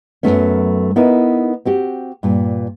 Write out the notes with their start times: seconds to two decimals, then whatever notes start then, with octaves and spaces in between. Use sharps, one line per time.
0.23 F#2 D3 F#3 A3 B3 C#4
0.96 B3 D#4 E4 A#4 B4
1.65 C4 F#4 G4
2.23 G2 A#2